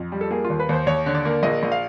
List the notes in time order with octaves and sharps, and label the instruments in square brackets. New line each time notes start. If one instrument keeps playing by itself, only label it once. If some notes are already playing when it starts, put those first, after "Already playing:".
Already playing: [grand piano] F2
G3
A4
A#3 G#4
F4
D#2
B4
D#2 C5
D#2 C#5
D3
D5
A#3
A#1 D#5
A#1
F5